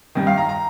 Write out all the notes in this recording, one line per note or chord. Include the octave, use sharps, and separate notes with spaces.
G2 D#3
F5
A#5
A#5